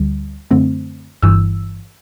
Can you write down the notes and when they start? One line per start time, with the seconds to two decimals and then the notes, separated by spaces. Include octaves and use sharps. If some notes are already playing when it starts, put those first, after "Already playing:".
Already playing: D2 D3 G3
0.51 F#2 D3 A3 C4
1.22 G1 G2 E3 E6